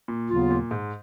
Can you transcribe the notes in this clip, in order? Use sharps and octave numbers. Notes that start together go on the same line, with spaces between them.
A#2
D#2 C#3 F#3 B3 F4
A#2
G#2